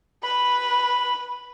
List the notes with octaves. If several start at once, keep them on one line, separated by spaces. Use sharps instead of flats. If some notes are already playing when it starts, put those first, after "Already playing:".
B4 B5